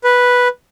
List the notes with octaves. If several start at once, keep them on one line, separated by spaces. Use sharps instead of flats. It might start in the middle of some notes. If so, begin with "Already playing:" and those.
B4